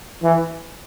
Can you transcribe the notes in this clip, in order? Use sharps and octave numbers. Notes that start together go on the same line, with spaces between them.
E3